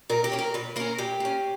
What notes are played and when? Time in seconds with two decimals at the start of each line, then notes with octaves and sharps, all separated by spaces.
0.09 A#2 A#4
0.24 G4
0.32 A#3 C#4
0.39 A#4
0.54 A#2 B4
0.76 A#3 C#4 A#4
0.98 A#2 G4
1.20 A#3 C#4